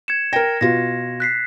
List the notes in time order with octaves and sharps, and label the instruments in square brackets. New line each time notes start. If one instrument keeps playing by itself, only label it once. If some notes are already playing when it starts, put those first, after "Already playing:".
[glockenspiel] G#6 C#7 E7
[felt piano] A#4 G5 [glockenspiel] A#6
[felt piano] B2 F4 F#4 [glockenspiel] A#6
[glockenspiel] F#6 B6 C7